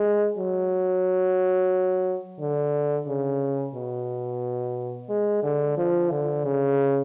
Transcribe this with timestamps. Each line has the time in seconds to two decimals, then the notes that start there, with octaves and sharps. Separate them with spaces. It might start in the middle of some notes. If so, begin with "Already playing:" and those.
Already playing: G#3
0.38 F#3
2.40 D3
3.07 C#3
3.74 B2
5.09 G#3
5.43 D3
5.77 F3
6.11 D3
6.44 C#3